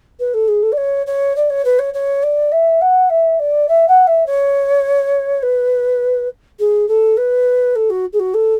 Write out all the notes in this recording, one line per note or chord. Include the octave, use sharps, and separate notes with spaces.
B4
A4
G#4
A4
D5
C#5
C#5
D5
C#5
B4
C#5
C#5
D5
E5
F#5
E5
D5
E5
F#5
E5
C#5
B4
G#4
A4
B4
A4
F#4
G#4
F#4
A4